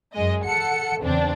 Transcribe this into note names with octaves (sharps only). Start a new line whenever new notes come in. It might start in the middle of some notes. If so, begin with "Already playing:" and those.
F#2 G#3 D#5
A4 F#5 C#7
E2 C#3 C4 D4